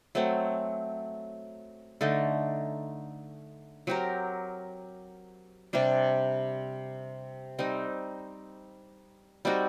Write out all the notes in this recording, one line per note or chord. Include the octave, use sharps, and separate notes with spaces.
F#3 A3 C4
D3 A3 D#4
F#3 C4 G4 A#4
C3 G3 D4
G3 C4 D#4
G3 C4 D#4 F#4